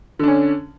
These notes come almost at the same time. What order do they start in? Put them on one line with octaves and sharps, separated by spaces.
D3 D4 C#4